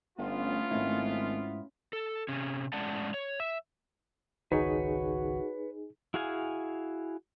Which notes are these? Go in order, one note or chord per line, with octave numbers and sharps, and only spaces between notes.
G1 A3 B3 C#4 F4
G#1 G#2 E4
A4
C3 C#4
A2 G#3 C#4 D5 F#5 A5
C#5
E5
G#1 C#2 D#3 D#4 F#4 G#4 B4 C#5
E4 F#4 G#4 F5 G#5